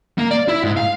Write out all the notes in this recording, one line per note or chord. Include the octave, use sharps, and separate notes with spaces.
A#3
D5
E4
G#2
F5